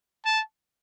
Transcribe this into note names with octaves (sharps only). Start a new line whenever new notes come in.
A5